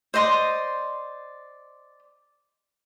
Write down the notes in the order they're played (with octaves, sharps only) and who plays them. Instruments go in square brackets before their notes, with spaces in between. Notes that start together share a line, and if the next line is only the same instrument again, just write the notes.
[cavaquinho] C5 D5 D#5 C6